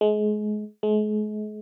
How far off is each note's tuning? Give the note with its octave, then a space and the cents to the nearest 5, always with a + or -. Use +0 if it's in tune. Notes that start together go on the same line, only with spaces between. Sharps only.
G#3 +30
G#3 +40